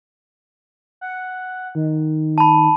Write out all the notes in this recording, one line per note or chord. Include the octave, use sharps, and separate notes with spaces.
F#5
D#3
A5 B5